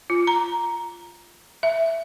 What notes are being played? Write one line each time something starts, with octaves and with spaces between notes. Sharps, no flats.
F4
A#5
E5